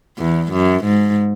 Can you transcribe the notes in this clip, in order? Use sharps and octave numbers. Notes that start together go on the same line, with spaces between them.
E2
F#2
G#2